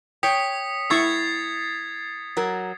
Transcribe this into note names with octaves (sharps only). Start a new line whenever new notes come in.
C#5 G5 D#6 B6 C#7
E4 C#6 E6 G#6 A6 C7
F#3 A#4